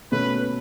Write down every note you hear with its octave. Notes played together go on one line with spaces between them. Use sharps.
B2 A3 C#4 B4